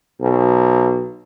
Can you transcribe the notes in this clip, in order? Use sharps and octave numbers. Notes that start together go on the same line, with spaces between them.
B1